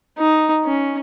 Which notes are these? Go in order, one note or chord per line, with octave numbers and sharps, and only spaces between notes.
D#4
C#4